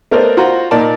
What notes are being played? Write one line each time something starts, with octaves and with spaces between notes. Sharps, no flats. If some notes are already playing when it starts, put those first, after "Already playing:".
A3 B3 A#4 C5 D5 D#5
F4 F#4 C5 F#5 A#5
A#2 D#4 A#4 D5 A5